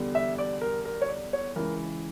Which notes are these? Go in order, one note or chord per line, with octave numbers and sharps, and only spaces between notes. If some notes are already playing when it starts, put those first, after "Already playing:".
Already playing: E2 D3 G3
E5
D5
A#4
A#4
C#5
D5
C#5
C#2 C#3 E3 A#4